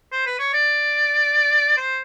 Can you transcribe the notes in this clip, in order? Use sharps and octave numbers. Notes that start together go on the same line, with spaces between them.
C5
B4
C#5
D5
C5